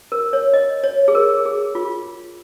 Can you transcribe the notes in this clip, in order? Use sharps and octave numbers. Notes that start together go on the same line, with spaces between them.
A#4
C#5
D#5
C#5
G#4
A#4
G#4
F4